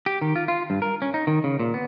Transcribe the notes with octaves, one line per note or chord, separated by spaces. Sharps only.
G4
D#3
F4
F4
G2
A#4
C#4
D#4
D#3
C#3
A#2
B3